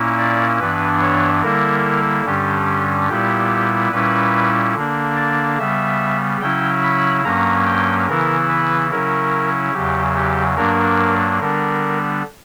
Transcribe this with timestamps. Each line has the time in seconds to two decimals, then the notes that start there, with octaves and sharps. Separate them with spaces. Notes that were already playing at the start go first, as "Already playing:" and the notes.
Already playing: A#2 A#3 C#4 E4
0.18 D5
0.59 G2 E3 B3 D4 B4
1.01 C#5
1.42 D3 G3 A#3 E4 A#4
2.25 G2 D3 G3 C#4 G4
3.09 A#2 G3 B3 E4 G4
3.92 A#2 G3 C#4 E4 B4
4.75 D3 A#3 D4
5.16 D5
5.58 C#3 G3 B3 E5
6.41 C#3 F#3 C#4 E4 G5
6.83 B5
7.24 G2 F#3 A#3 C#4 A#5
7.66 G5
8.07 C#3 E3 B3 E4 A#4
8.49 B4
8.91 C#3 F#3 C#4 E4 A#4
9.73 E2 C#3 F#3 G4
10.15 G4
10.57 G2 F#3 A#3 D4 A#4
11.39 D3 G3 B3 D4 A#4